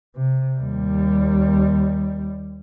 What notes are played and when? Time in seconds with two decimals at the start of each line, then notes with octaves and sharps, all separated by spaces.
0.16 C3
0.58 D#2 G3